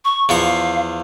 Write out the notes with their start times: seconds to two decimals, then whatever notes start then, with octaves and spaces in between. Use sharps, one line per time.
0.05 C#6
0.29 E2 F3 F5 C#6